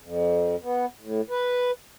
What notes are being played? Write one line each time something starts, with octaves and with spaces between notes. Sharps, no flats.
F2
B3
A2
B4